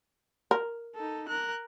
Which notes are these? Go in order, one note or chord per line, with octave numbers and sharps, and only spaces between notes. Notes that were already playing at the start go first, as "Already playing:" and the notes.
A#4
D#4 A4
A#4 F#6